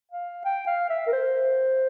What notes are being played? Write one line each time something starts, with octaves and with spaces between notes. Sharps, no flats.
F5
G5
F5
E5
A#4
C5